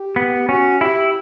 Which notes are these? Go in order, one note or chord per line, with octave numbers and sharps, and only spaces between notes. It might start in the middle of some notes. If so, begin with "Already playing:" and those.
Already playing: G4
B3
C#4 F#4
E4 G4